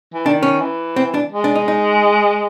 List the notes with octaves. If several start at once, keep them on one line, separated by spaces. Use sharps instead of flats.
E3
D#3 D4
C#4
E3
C4
D4
G#3
D4
D#4
D#4